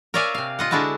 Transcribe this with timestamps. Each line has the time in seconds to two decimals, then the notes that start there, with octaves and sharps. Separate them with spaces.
0.14 A#4 C#5 D5 E5 F5 G#5
0.34 C3 F5
0.59 F4 D#5 F#5
0.71 D3 G#3 D4 E4 F#4 A5